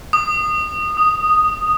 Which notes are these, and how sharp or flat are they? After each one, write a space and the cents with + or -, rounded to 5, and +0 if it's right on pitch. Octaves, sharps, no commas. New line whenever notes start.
D#6 -25
D#6 -5